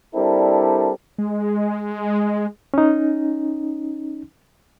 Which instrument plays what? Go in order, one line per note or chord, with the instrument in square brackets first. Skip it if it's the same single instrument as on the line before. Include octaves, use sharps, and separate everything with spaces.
[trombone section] G3 C4 D4 E4 A4 A#4
[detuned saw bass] G#3
[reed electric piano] C#4 D#4